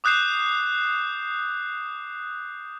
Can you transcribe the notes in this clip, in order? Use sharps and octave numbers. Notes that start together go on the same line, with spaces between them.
D6 D#6 F#6 G6 C7 E7